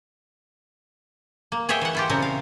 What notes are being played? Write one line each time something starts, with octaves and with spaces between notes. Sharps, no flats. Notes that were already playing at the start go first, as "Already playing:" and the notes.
A#3
G#4 C#5 D#5 E5 G5 G#5
E3 F#5
E4 F4 G4
A#2 C#3 C4 A#4
F5